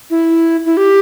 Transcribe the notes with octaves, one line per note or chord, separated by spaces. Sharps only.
E4
E4
G4